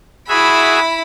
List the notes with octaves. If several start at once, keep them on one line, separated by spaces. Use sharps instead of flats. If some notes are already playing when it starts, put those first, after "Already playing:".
E4 F#4 G#4 E5 B5